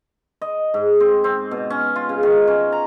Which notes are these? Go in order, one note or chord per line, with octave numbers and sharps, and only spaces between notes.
D#5
G#2
C4
C4
B2
C#4
F4
C#3
D#3
C#4
A#5